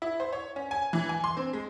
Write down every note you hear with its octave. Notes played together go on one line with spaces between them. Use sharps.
E4
C5
C#5
C#4
G#5
E3
G#5
C6
C4
G#3